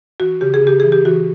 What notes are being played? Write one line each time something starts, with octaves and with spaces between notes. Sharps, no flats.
E3 F#4
C#3 G4
G#4
C#3 G4
E3 G#4
G4
E3 F#4